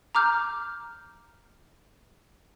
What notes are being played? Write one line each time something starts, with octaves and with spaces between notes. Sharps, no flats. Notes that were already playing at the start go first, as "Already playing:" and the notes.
A#5 D6 F6 G6